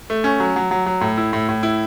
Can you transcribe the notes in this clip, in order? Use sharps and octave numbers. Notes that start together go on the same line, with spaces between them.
A3
C#4
F#3
F#3
F#3
F#3
A2
E4
A2
A2
E4